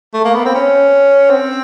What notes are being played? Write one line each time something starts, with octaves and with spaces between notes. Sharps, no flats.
A3
A#3
B3
C4
C#4
C4